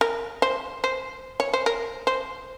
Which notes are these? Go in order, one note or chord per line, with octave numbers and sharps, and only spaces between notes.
A#4
C5
C5
C#5
C5
A#4
C5